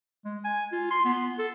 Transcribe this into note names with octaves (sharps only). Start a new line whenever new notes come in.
G#3
G#5
F4
C6
B3
A4